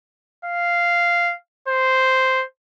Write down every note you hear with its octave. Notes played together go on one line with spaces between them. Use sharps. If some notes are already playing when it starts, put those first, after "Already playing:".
F5
C5